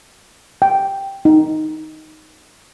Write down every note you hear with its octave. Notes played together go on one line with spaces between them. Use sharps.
G5
D#4